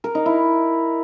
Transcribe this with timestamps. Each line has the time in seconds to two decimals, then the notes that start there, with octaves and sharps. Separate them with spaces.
0.04 A#4
0.15 D#4
0.26 E4